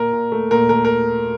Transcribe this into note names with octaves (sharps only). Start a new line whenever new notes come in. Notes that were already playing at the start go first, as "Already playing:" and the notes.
Already playing: A#2 A#4
A#2
A3
A#2 A#4
A3 A#4
A#4